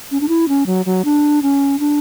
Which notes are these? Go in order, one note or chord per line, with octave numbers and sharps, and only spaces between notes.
C#4
D4
E4
C#4
F#3
F#3
D4
C#4
D4